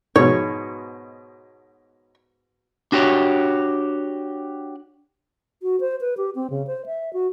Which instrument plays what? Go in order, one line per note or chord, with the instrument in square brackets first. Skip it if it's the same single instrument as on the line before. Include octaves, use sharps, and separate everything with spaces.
[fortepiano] G#2 B2 [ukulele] C#5
[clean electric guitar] D4 F#4 G4 C#5
[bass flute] F#4
C5
B4
G4
C4
C#3
C5
E5
F#4